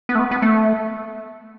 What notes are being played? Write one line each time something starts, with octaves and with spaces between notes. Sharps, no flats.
B3
A3
B3
B3
A3